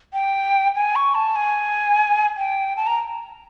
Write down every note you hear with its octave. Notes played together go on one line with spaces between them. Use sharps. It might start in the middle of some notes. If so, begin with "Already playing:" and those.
G5
G#5
C#6
A5
G#5
G5
A5
A#5